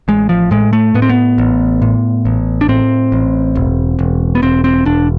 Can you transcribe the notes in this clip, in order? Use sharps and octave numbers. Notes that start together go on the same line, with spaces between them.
A1 G#3
F3
A2 G#3
A3
A2 B3
C4
B3
A1
A2
A1
D4
A2 C4
A1
E1
E1
B3
E1 C4
C4
E1 D4